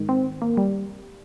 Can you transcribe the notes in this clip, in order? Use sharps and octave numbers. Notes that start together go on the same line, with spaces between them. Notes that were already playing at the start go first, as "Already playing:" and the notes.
Already playing: G#2 D#3
C4
A#3
G3